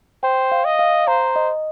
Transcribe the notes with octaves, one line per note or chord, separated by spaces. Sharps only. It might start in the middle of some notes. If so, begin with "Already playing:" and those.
C5 G5
F5
D#5
F5
C5 A#5
D#5